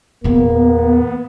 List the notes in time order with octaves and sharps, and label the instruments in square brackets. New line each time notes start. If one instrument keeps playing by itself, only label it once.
[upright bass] E2 A#2 [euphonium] A#3 [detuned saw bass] B3